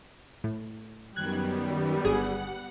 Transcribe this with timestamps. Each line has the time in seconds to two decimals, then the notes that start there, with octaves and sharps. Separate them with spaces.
0.44 A2
1.16 F#2 D#3 G3 B3 F#6 G#6
2.05 G1 G#4 F#5